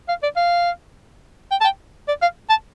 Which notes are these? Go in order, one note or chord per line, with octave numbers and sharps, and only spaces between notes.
F5
D5
F5
G5
A5
G5
D5
F5
A5